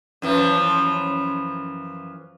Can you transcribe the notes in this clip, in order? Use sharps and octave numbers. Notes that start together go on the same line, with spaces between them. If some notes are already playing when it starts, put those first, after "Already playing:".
F#2 E3 F3